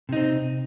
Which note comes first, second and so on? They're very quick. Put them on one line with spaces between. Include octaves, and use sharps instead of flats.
C3 D#4 C4